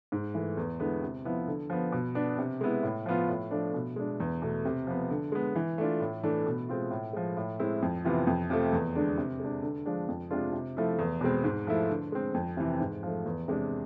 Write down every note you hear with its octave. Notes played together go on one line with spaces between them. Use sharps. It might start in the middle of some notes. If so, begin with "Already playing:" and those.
G#2
E3 A3
E2
D3 G#3 B3 E4
C3
F3 B3 E4
D3
F3 B3
B2
B3 D4
C3
G#3 B3 E4
A2
F3 B3 F4
A2
F3 A3 D4
B2
G#3 D4
E2
B2 A3
C3
F3 B3
D3
G#3 B3
E3
A3 D4 F4
A2
E3 A3 D4
B2
G#3 C4 F4
A2
F3 G#3
A2
G#3 C4 E4
F2
C3 E3 B3 F4
F2
C3 F3 A3
E2
D3 G#3 D4
C3
G#3 D4
D3
F3 G#3 D4
F2
C3 G#3 D4 F4
C3
F3 A3 E4
E2
B2 G#3 C4
G#2
F3 A3 E4
D3
G#3 C4
F2
C3 E3
G#2
F3 A3
E2
C3 G#3 D4